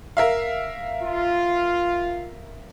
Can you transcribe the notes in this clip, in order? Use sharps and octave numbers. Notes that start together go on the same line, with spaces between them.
A#4 E5 F5
F4